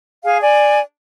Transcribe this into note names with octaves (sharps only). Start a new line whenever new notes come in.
G#4 F5 G#5
D5 G#5